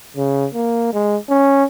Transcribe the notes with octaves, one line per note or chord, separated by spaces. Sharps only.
C#3
A#3
G#3
C#4